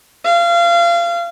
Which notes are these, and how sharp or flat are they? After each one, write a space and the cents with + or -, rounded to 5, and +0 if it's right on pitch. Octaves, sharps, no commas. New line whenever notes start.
F5 -30